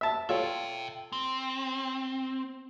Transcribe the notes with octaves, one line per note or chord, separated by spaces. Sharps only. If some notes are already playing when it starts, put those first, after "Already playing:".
E5 A5
F4 A4 C#5 E5 G5
C4